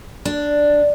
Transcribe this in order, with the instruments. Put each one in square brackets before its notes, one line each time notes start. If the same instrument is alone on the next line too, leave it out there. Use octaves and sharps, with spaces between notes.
[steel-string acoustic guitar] D4